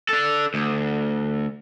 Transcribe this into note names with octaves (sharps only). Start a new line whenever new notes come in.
D4 A4
D2